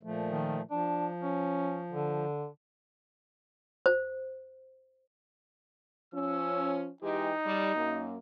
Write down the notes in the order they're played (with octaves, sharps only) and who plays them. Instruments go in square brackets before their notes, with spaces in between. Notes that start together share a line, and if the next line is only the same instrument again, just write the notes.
[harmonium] A#2 F3 A3
[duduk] D#3
[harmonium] F3 [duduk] D4
[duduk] C#4
D3
[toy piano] C5
[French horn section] F3 C#4 [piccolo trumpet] E6
[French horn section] E3 G#3 G4 [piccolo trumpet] D#4
[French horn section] G3
F#2 A#3